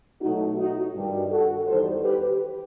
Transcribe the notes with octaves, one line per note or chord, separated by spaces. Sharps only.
B2 F#3 A3 D#4 F#4
D#4 F#4
G2 D#3 G3
F#4 A4
E2 D#3 G3 A4 C5
G4 B4